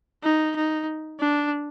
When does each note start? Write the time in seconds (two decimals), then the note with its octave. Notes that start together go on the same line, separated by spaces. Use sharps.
0.23 D#4
0.56 D#4
1.20 D4